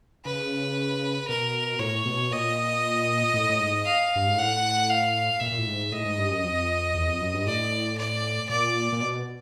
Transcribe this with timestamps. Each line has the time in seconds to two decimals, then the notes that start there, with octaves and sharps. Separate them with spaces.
0.25 C#3 B4
1.28 B2 A#4
1.79 A2 C#5
2.06 B2
2.31 A#2 D#5
3.34 A2
3.50 A2
3.59 G#2
3.86 F5
4.16 G2
4.26 G#2
4.37 A2 F#5
4.89 F5
5.40 A#2 E5
5.52 A#2
5.58 A2
5.67 G#2
5.92 A2 D#5
6.05 G#2
6.18 G2
6.30 F#2
6.43 F2
6.94 E2
7.08 F2
7.20 F#2
7.34 G2
7.47 A2 D5
7.98 D5
8.49 A#2 D5
8.93 A#2
9.01 B2